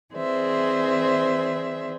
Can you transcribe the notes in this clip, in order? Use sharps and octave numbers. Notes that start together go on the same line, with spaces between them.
E3 C4 G#4 C5 D5 E5